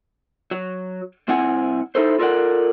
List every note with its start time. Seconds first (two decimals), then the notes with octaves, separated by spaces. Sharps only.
0.51 F#3
1.28 C2 C4 E4 F#5 G#5
1.95 D#4 E4 A4 C5
2.19 F4 A4 A#4 C#5 D5 F#5